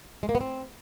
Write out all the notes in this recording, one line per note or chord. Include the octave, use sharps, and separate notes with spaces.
G#3
A#3
B3
C4